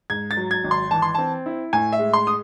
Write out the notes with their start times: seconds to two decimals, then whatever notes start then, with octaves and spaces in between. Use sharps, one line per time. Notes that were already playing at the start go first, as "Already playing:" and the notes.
0.10 G#2 G#6
0.31 A6
0.37 F#3
0.51 G#6
0.64 G#1
0.71 C6
0.91 E3 A5
1.02 C6
1.15 C4 A5
1.46 E4
1.73 A2 G#5
1.92 E5
1.99 G#3
2.13 C6
2.27 D#6